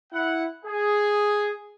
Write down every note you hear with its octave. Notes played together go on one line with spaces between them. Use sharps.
E4 F#5
G#4